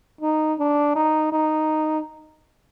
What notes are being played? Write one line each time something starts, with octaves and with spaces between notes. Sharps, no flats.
D#4
D4
D#4
D#4